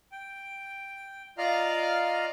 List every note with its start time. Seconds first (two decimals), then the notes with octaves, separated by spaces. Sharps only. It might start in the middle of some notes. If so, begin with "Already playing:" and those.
0.12 G5
1.38 F4 D5 D#5 F5 A#5 F6